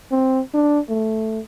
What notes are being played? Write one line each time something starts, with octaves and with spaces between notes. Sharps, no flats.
C4
D4
A3